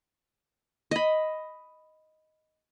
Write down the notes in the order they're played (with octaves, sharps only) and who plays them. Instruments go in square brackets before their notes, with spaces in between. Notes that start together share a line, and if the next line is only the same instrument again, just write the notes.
[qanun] D#5 B5